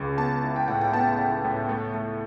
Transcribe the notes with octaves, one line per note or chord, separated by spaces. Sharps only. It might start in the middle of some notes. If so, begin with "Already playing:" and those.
Already playing: C#2 C#3
B3 A5
E4
G5
A2 F#5
G5
B3 A5
E4
A2
A3
A3